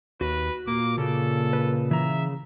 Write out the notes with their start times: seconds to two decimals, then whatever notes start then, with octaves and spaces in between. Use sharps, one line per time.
0.21 D#2 F#4 B4
0.67 A#2 A#3 D6
0.98 C#3 A4
1.53 B4
1.91 E3 E5 A#5